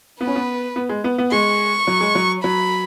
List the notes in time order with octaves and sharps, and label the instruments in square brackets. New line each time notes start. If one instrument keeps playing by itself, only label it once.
[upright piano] B3 [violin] B4
[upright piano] C#4
B3
B3
G#3
B3
B3
[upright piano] G#3 [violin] C#6
[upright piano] F#3
G#3
F#3
[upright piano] F#3 [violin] B5